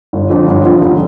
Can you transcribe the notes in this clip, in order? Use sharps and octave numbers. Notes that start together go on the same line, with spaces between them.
G1
F2 D3 F3
G1
F2 D3 F3
F1